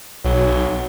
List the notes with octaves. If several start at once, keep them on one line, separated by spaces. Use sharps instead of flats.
B1 F#3